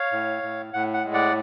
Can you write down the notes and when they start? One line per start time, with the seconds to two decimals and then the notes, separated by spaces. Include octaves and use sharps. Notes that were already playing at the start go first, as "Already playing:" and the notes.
Already playing: C#5 F5
0.12 A2
0.43 A2
0.73 A2 F#5
0.94 F#5
1.05 G#3
1.14 D5 F#5